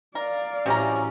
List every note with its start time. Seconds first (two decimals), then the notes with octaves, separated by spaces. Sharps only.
0.15 A#4 D5 F5
0.66 A1 C3 F#3 C#4 G4 A#5